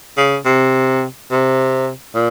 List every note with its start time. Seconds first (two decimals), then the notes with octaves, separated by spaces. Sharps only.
0.17 C#3
0.45 C3
1.31 C3
2.15 A#2